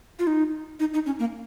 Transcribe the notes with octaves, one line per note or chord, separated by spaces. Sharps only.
F4
D#4
D#4
D#4
C#4
A#3